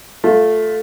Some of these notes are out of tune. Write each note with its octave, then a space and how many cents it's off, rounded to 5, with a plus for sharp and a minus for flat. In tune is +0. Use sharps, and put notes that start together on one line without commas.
A3 -5 F4 +15